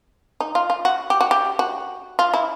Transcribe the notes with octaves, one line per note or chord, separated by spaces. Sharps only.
D#4
F4
F4
F#4
G4
F#4
G4
F#4
F4
E4